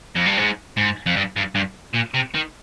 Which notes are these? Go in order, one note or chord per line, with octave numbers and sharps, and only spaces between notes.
F2
G2
G#2
G#2
F2
G2
G2
G2
A#2
C3
D#3